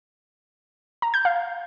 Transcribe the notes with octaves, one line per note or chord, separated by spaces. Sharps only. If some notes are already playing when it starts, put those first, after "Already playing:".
A#5
G6
F5